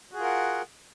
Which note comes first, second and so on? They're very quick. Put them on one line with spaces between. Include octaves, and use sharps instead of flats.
F#4 G#4 F4 A#4 F#5